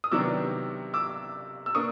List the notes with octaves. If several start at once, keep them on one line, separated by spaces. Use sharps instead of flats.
D#6
C3 D#3 F#3 B3 D4 D6 E6
D6 E6
E6
A#3 D4 C#6 D#6